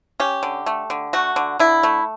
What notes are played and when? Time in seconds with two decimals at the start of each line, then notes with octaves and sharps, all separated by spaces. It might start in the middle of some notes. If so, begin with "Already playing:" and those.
0.20 C#4 G4
0.43 D3
0.66 A3
0.90 D3
1.13 A3 F#4
1.36 D3
1.59 D3 E4
1.83 A3